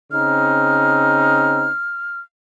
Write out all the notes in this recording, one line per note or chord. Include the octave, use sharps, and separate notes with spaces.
C#3 C4 D#4 F6